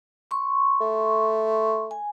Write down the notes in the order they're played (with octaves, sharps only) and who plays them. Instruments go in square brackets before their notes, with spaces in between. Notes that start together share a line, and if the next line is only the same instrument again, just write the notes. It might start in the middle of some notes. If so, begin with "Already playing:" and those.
[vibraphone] C6 C#6
[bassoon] A3
[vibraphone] G#5